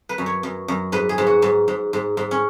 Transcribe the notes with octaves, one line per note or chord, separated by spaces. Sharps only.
B4
F#2
C#5
F#2
F#2
G#2 B4
G#4
G#2
F#4
G#2
G#2
G#2
G#2
C#4